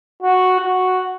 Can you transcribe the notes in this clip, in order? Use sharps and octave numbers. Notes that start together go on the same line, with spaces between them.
F#4
F#4